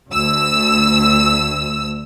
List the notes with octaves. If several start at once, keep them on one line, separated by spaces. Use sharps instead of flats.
D2 E6